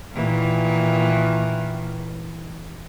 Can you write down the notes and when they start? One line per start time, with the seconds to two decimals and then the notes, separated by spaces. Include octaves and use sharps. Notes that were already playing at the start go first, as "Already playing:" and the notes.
0.14 A#2 D#3 E3